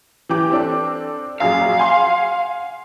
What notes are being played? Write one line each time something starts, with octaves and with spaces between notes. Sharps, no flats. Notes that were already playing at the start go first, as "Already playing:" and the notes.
E3 G4 D6
C4 D4 A4
A#1 F#2 G#4 F5
F#5 G#5 C6